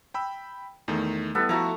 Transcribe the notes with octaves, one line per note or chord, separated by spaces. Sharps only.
G5 B5 E6
E2 D#3 A3
G3 B3 E4 A4
F3 A3 E4 F#4 A#5